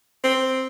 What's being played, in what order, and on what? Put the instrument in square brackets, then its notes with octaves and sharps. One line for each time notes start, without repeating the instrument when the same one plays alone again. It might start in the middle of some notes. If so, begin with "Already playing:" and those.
[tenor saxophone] C4